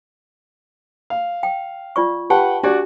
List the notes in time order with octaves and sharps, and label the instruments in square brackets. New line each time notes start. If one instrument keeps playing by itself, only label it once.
[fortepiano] F5
[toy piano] G5
F4 D5 C#6
[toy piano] G4 A5 [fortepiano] B4 F#5 G5
[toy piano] D4 G4 [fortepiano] F#4 D5